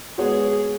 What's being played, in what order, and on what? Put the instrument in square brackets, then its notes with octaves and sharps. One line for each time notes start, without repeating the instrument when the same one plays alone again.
[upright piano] G#3 B3 F#4 C#5 [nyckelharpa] G#4